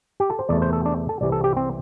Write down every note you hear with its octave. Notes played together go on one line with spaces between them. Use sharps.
G4
A4
C5
E2 C3 A3 D5
C5
A4
D4
A4
C2 C3 E3 G3 D5
A4
G4
C4